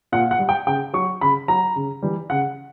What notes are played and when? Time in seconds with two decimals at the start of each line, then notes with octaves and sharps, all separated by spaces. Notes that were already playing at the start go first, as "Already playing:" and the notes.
0.12 A#2 F#5
0.31 F#5
0.39 G3
0.49 G5
0.67 C#3 G5
0.93 F#3 C#6
1.21 C#3 B5
1.48 F#3 A#5
1.75 C#3
2.02 E3 G3
2.30 C#3 F#5